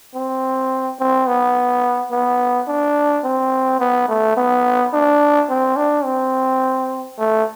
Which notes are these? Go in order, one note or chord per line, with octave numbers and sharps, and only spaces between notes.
C4
C4
B3
B3
D4
C4
B3
A3
B3
D4
C4
D4
C4
A3